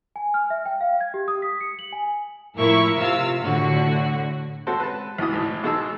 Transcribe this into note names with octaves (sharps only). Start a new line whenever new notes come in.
G#5
F6
E5
G5
F5
G#6
G4
D#6
B6
C#7
F#7
G#5
A2 F3 E4 A#4 E5 C#6
C3 F4 F5 E6
A2 D3 F#4
G#3 C4 C#4 F#4 A4 C5
B4 A5
C#2 B2 E3 D#6
G#1 A2
B2 G#3 D#4 G#4 A5 E6